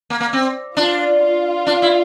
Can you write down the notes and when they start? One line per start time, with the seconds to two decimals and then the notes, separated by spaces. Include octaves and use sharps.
0.10 A#3
0.20 A#3
0.33 C4
0.77 D4 F4
1.22 F4
1.67 D4
1.82 E4